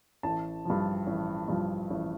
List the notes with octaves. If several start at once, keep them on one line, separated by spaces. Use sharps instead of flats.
A1 A5
G2 F3
A1
G2 F3
A1